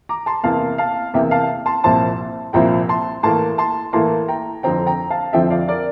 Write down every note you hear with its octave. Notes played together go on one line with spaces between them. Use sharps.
A#5 D6
A5 C6
E2 C3 E3 A#3 F5 A5
F5 A5
E2 C3 E3 A#3 E5 G5
F5 A5
A5 C6
C2 A#2 F3 C4 E4 A5 C6
C2 A#2 F3 C4 E4 G5 A#5
A5 C6
A2 E3 A#3 A5 C6
A5 C6
A2 E3 A#3 A5 C6
G5 A#5
F2 D3 F3 C4 G5 A#5
G5 A#5
F5 A5
F2 D3 F3 C4 E5 G5
E5
D5 F5
A#4 D5